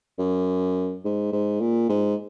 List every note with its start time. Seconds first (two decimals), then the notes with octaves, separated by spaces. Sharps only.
0.19 F#2
1.05 G#2
1.32 G#2
1.60 A#2
1.89 G#2